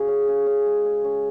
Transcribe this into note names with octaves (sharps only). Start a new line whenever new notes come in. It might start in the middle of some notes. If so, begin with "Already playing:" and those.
Already playing: C#3 F#4
C#4
C#3
C#4
G#3
C#4
C#4